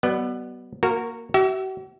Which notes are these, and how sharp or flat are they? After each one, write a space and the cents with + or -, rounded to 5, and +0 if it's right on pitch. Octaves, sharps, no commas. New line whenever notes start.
F#3 +45 B3 +0 D5 +40
A#3 +0 F#4 -5 A#4 -20
F#4 +45 E5 -5